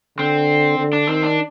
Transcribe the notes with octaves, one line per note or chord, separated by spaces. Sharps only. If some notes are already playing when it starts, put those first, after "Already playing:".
D3 C4
D3
D4
D#3 C4
D4